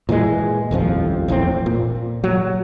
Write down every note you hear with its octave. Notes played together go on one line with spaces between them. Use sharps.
A#2 E3 F3 G#3
D#1 A1 F2 F3
A#1 E2 A2 C4
A#2
F#3